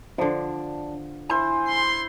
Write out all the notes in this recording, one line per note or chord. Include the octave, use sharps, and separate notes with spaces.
D3 F3 D4
E4 C5 G#5
C6